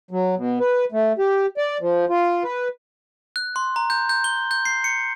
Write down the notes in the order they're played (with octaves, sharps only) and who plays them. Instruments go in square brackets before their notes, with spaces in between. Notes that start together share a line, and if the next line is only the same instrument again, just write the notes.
[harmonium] F#3
B2
B4
A3
G4
D5
F3
F4
B4
[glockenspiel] F#6
C6
A#5
G6
G6
G7
G6
C7
C#7